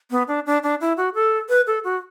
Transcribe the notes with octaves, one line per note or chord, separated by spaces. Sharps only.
B3
D4
D4
D4
E4
F#4
A4
B4
A4
F#4